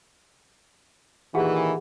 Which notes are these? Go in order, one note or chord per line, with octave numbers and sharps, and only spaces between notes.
A#2 D#3 E3 G4 G#4 F#5